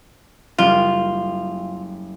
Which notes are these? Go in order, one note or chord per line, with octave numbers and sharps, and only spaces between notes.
F#1 G3 F4 D7